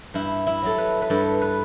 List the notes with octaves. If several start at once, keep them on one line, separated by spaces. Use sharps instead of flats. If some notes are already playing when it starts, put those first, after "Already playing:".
G2 E4
E4
F#3 A4
B4
B4
G2 A4
B4